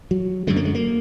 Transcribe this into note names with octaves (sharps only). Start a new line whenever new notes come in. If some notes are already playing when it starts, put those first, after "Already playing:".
F#3
F#2 D3 G#3
A#3
G#3
A#3